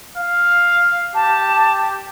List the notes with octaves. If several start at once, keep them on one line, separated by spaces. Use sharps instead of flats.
F5
G4 A5